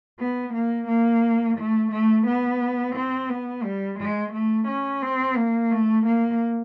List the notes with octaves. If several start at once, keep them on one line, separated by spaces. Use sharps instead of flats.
B3
A#3
A#3
A3
A3
B3
C4
B3
G3
G#3
A3
C#4
C4
A#3
A3
A#3